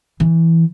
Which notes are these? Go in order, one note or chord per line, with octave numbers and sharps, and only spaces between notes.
E3